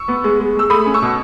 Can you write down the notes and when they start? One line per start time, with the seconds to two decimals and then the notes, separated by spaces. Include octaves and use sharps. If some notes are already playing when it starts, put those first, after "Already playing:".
Already playing: C#6 E6
0.08 B3
0.24 G#3
0.40 G#3
0.55 G#3 E6
0.70 A3 B5 D#6
0.86 C#4
0.94 C#6 E6
1.02 B2